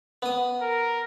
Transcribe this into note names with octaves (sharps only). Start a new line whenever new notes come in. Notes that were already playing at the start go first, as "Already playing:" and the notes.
B3 D#6
A#4